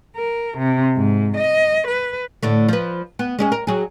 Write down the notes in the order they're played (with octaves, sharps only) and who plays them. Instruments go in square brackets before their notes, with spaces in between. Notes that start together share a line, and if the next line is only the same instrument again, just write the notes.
[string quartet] A#4
C3
G#2
D#5
B4
[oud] A2 D3 A3
F3 B4
B3
G#3 C#4 G#4
A#4
F#3 G#4